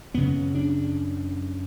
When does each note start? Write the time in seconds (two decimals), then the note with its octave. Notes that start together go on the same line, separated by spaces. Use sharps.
0.14 F#2 C#3 B3
0.55 D4